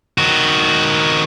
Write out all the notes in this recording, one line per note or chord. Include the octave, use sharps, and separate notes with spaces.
D#3 F#4